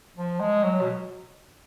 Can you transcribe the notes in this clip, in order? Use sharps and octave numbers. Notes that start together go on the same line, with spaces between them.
F3
G#3
F#3
B2